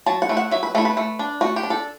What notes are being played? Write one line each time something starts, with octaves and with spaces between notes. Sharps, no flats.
F#3 A5
F#5
A3 E4
F#5
F#3 E5
B4
A3 E4 A4
B4
A3
D4
A3 F#4
G4
D4
A4